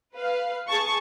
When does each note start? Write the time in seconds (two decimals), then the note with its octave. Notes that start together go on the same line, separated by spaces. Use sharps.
0.15 B4 F5
0.68 G#4 A5 C#6